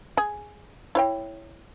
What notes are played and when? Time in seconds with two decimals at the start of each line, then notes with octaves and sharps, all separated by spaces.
0.17 G#4
0.95 E4 C#5 G5